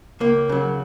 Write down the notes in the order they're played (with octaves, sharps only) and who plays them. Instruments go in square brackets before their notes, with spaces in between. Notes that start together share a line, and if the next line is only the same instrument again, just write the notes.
[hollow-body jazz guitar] C#2 A#3
C#3 F#3